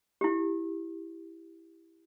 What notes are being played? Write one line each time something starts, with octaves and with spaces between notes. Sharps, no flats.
E4 G4